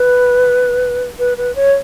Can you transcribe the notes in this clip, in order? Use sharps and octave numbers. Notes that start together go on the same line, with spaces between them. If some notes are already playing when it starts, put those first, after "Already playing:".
Already playing: B4
B4
B4
C#5